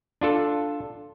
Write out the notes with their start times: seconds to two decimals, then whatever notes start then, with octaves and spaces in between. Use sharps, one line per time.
0.21 D4 F4 A4